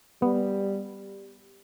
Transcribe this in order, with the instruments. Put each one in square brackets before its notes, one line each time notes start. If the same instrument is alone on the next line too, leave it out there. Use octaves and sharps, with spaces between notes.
[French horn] G3 [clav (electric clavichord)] B3